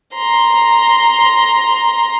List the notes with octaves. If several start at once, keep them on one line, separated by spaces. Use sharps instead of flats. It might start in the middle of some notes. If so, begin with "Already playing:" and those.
A#5 C6